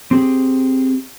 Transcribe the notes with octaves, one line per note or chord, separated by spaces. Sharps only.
C4 G4 G#4